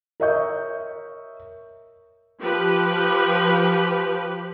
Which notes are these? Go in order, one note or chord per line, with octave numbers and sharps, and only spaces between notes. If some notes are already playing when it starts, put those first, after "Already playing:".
A#4 C#5 D#5 E5 C#6 G6
F3 G4 B4